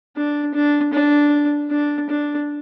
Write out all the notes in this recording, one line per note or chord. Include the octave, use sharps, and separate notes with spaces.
D4
D4
D4
D4
D4